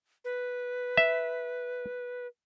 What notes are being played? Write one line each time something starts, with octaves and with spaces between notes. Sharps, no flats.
B4
E5